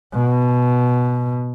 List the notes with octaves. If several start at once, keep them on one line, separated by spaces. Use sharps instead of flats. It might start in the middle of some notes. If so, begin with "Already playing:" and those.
B2